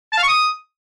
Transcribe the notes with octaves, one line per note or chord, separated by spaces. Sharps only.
A5
F5
C#6
D#6